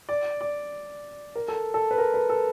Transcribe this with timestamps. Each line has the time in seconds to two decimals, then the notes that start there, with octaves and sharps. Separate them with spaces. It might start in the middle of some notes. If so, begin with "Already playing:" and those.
0.09 D5
0.41 D5
1.36 A#4
1.48 A4
1.74 A4
1.91 B4
1.98 A#4
2.14 B4
2.29 A4